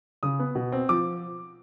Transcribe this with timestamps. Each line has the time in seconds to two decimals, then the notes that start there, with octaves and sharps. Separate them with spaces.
0.23 C#3 D#6
0.39 B3
0.55 B2
0.72 C4
0.89 F3 D6